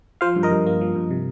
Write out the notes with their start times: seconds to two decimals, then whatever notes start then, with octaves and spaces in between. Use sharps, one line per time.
0.21 F3 C5 F5
0.36 G2
0.43 A#4 D#5
0.52 G2
0.66 A#3
0.81 F3
0.95 G2
1.11 C3